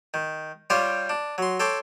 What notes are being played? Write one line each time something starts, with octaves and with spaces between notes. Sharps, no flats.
D#3
G3 F4 G4 C5 C#5 F5
D4
F#3 C6
A4 C#5 G5 C6 D6